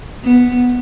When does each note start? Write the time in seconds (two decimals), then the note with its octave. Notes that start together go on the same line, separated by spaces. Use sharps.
0.24 B3